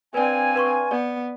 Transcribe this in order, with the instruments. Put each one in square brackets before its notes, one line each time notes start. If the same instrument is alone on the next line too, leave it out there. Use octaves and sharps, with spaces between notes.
[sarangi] C4 [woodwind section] D4 F5 G#5 [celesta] B4 D5
[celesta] B4 C6 C#6
[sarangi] B3 [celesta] D5